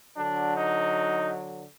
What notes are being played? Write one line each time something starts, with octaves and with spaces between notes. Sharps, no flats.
D3 F#3 D4
D#4